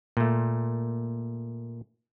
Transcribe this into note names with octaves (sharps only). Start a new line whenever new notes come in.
A#2 A3